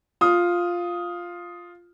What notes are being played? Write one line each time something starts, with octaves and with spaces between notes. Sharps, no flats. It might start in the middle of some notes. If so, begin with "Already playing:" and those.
F4 D#6